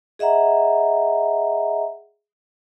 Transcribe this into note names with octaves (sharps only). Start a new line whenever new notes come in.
G#4 D#5 E5 F#5 A#5